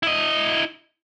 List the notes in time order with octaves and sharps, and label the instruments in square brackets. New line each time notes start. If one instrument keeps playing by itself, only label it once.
[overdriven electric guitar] E4 D#5